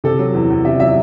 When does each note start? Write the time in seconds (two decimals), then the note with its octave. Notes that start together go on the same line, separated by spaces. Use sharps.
0.04 C3 A4
0.19 F#3
0.34 E2
0.50 E2
0.65 C3 E5
0.80 F#3 E5